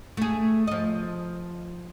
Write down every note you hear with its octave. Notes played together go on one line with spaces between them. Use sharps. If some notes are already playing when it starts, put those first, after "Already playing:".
A3 G#4
F3 D#5